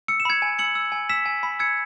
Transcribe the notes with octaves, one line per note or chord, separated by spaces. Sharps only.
E6 C#7
E7
B5 G#6 C#7
G#5
E6 C#7 F#7
E6
G#5
E6 B6 E7
G#5
B5
E6 G#6 C#7